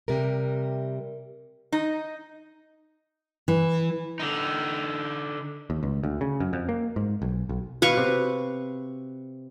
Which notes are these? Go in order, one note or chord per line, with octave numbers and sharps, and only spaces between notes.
C3 G3 A#4
D#4
E3
D3 D#4
D#2
C#2
D2
C#3
F#2
F2
A#3
G#2
B1
B1
B2 B4 F5 C#6
C3